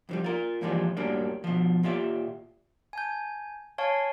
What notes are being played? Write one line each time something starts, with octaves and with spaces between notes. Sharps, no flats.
F2 E3 G3
F4 A#4
G2 A#2 E3 F3 G3 G#3
F#2 A2 F#3 G3 A#3 D4
B2 F3
A#2 F4 G4 E5 F5
G#5 A5 G6
C#5 F5 G#5 A5 C#6